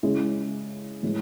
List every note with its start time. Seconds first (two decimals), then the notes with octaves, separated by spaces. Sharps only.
0.03 C#3 G#3 C#4 E4
1.03 A2 E3 G#3